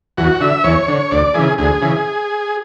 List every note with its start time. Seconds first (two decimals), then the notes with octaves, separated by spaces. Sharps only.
0.17 E2 F#4
0.40 D3 E5
0.64 E2 C#5
0.88 D3
1.11 D2 D5
1.34 C#3 E3 G#4
1.58 D2 G#4
1.82 C#3 E3